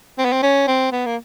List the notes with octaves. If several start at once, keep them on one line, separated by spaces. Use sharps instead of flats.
C4
B3
C4
C#4
C4
B3
A#3